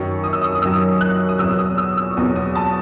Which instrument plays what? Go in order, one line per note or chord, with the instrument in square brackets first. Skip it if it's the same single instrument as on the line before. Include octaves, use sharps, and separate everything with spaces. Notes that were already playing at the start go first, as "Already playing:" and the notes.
Already playing: [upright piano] F#2 D#3 F#3 C#6
D#6
E6
D#6
D#6
F#2 D#3 F#3 E6
F#6
D#6
E2 B2 F#3 E6
D#6
E6
E6
C#6
E2 B2 F#3 D#6
D#6
A5